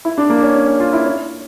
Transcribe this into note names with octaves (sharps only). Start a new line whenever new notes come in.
E4
D4
A#3
C#4
C#4
C#4
F4
E4
C#4